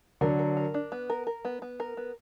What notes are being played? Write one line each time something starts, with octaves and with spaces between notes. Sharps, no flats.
D3 F#3 A#4
A#4
A#4
D4
B3
A#4
A#4
B3
B3
A#4
B3